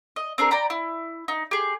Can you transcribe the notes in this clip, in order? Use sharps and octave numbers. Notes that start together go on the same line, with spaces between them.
D#5
C4 D4 G#4 A#4
D5 G5 A#5 B5
E4
D#4
G4 G#4